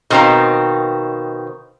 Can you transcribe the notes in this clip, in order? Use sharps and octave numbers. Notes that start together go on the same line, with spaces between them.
B2 D#3 C4 F5 A#5